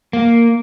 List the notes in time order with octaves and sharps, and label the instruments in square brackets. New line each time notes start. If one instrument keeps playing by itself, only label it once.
[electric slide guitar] A#3